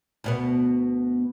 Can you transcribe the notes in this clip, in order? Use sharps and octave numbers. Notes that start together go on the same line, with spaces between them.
D2 B2 B3